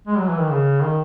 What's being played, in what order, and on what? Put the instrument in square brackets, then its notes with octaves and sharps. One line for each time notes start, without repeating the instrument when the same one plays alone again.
[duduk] G#3
F#3
E3
D#3
C#3
D#3